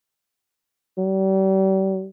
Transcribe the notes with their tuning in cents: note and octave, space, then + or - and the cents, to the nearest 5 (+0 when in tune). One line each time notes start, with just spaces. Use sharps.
G3 -40